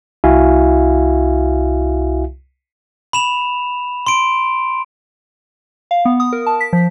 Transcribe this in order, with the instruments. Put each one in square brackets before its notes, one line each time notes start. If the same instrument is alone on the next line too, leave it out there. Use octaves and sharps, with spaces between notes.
[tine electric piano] C2 E4 F#4 E5 F5 G#5
[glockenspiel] B5 E7 F7
C6 D7
[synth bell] F5
B3
D#6
A#4
A5
B6
F3